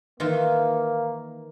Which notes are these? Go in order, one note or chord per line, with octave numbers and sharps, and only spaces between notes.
D#3 E3 A#3 F4